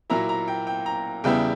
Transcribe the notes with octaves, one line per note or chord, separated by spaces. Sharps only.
A#2 F#3 A#3 E4 A#5
A#5
G5
G5
A#5
E2 C#3 G3 B3 E4 G5